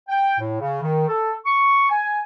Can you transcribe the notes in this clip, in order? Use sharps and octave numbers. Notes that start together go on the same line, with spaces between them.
G5
A2
C#3
D#3
A4
C#6
G#5